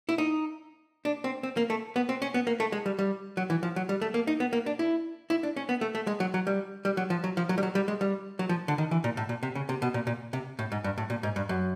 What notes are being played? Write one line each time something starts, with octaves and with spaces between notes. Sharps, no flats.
E4
D#4
D4
C4
C4
A#3
A3
B3
C4
C#4
B3
A#3
A3
G#3
G3
G3
F#3
E3
F3
F#3
G3
A3
A#3
D#4
B3
A#3
D4
E4
E4
D4
C#4
B3
A3
A3
G#3
F#3
F#3
G3
G3
F#3
F3
F#3
F3
F#3
G3
F#3
G3
G#3
G3
F#3
F3
D3
D#3
E3
A#2
A2
A#2
C3
C#3
C3
B2
A#2
A#2
C3
A2
G#2
G2
A2
A#2
G#2
G2
F#2